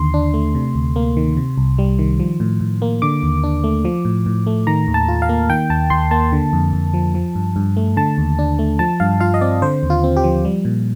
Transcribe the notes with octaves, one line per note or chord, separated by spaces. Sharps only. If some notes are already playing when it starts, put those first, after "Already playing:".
Already playing: D#2 D3 C6
D4
A3
C3
D2
A#3
D#3
C3
C2
G3
D#3
F3
A2
A2
A#3
D3 D6
D#2
D4
A3
F3
A2
A2
A3
D#3 A#5
D#2
A5
F4
F5
A#3
D#3 G5
D#2 A5
D#2 C6
A#3 A5
D3
F2
F2
F3
F3
G2
G2
A3
D3 A5
D#2
D4
A3
F3 A5
G2 F5
F4 F5
D#5
C4 D5
D3 C5
D#2
F4
C4
G4
F3
G3
A#2